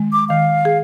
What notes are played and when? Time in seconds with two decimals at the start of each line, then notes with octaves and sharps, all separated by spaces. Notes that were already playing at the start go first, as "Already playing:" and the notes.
Already playing: D#3 G#3
0.12 D6
0.29 D#3 F5
0.65 G#4